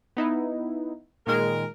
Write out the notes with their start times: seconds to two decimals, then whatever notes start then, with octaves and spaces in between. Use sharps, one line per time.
0.17 B3 D#4 E4
1.27 A#2 D#3 G#3 A#4